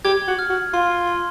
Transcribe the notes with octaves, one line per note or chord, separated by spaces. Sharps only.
G4 G#6
F#4
F6
F#4
F4 C6
C6